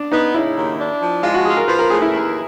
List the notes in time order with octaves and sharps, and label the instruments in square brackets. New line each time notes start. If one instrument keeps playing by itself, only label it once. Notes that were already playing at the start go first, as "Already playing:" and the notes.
Already playing: [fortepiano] D4
[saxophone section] B3 [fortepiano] D#4
[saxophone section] C#3 [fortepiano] E4
[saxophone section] D#2
D4
F3
[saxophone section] G#3 [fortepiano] F4
[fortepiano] F#4
[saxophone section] F4 [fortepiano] G#4
[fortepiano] A#4
[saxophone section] F3 [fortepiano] B4
[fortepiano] A#4
[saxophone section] A2 [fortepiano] G#4
[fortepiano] E4
[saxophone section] D#2